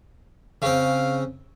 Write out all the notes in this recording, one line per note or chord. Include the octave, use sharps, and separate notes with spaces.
C#3 C4 F5